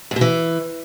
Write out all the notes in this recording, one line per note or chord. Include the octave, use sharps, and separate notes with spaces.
G2
B2
E3